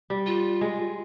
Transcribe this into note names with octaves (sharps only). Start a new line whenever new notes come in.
G3
F4
G#3